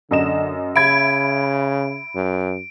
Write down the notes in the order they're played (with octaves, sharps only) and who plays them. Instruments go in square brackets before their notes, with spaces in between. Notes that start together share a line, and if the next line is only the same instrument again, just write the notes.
[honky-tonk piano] F#2 D#5 E7 [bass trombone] D3
[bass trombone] C#3 [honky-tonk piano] E5 B5 G#6 [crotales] D7
[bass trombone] F#2